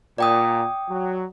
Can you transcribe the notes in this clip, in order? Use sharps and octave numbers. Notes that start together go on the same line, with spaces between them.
A#2 D5 G5 D#6
F#3